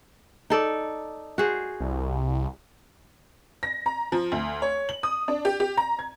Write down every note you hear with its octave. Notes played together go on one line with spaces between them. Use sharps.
D#4 A4 D5
F#4 G#4 C5
C2
A#6
A#5
F3
D2
C#5
F#7
D#6
D4
G4
G4
A#5
G#6